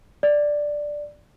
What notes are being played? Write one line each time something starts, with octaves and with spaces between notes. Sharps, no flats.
D5